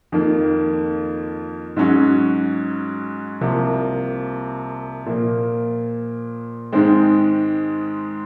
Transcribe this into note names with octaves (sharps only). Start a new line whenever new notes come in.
F2 D#3 A#3
G#2 F#3 C#4 F#4
C2 C3 F3 A#3
A#2 F3 A#3
G#2 D#3 G#3 C4